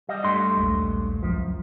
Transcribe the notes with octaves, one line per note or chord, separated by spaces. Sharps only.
G3 D#5
G2 A3 C6
A#1 D#2 G#3
C#2 F#2 F3